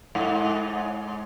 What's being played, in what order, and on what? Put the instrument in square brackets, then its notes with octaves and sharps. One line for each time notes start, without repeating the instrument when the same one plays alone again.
[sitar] G#2